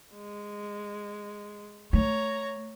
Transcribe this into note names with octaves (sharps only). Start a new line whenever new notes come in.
G#3
A3 C#5 A#5